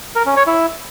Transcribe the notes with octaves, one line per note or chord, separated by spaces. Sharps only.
A#4
C#4
C#5
E4